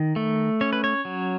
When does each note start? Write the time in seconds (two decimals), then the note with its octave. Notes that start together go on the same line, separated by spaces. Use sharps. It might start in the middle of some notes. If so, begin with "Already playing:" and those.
Already playing: D#3
0.16 A3
0.61 C#4 C#5
0.73 B4
0.84 C#5
1.05 F#3